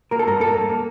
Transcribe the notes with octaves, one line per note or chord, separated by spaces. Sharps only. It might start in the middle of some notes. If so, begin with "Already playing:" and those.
A#3 A#4
A4
G2 A#4
A#3 A4
A#3
A#3